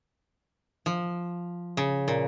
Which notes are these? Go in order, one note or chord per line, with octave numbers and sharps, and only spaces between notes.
F3
C#3
A#2